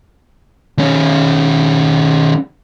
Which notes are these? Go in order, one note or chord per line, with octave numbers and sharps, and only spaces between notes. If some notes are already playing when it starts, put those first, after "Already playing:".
D#3 C#4